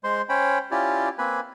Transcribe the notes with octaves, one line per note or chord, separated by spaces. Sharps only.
G#3 C5 C6
C#4 C5 C#5 G5 B5
C#4 E4 F4 G4 D5
A#3 C4 B4 G#5 B5